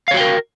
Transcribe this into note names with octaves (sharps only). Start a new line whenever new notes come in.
F#4 A#4 C#5 F5 G5